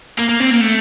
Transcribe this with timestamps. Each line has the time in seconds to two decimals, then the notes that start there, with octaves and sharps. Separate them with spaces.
0.19 A#3
0.29 A#3
0.40 C4
0.51 A#3
0.61 A3